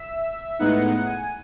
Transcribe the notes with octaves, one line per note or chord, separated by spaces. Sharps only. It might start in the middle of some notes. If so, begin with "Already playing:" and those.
Already playing: E5
A2 G#3 B3 D#4 F#5
G#5